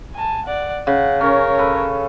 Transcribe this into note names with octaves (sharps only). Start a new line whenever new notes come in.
G#5 A5
D5 F#5
C#3 F#5
C#4 A#4 C#5
A4 B4